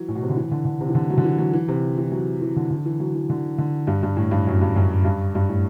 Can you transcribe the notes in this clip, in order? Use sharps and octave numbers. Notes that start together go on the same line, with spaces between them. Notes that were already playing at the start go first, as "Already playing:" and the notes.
Already playing: E3 F#3
A2
B2
C3
D3
E3
D3
D3
C3
E3
D3
F#3
D3
E3
F#3
E3
C3
E3
F#3
E3
D3
D3
E3
F#3
E3
D3
D3
G2
G2
A2
G2
F#2
G2
F#2
G2
G2
A2